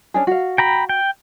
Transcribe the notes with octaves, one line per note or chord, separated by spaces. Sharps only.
C#4 D4 G#4
F#4 F5
G5 A#5 B5
G5